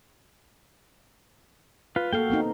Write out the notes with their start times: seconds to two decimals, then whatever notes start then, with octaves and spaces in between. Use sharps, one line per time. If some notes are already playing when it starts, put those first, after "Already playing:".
1.96 F4 B4
2.13 A#3 F#4 A4 F5 G5
2.30 B3 C4 D#4